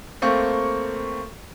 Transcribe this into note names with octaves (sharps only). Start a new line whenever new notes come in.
A3 A#3 C4 C#6